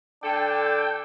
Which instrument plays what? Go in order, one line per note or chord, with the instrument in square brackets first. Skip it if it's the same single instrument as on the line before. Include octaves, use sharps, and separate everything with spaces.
[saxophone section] D3 A4 [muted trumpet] D4 [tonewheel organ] G5